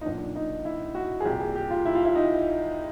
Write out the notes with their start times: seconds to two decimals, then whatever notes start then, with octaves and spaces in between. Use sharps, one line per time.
0.01 D#4
0.05 B1 A#2 D4
0.36 D#4
0.65 E4
0.95 F#4
1.20 G#4
1.25 C2 A#2 G4
1.40 G#4
1.55 G4
1.70 F4
1.86 E4
1.95 F4
2.05 E4
2.15 D#4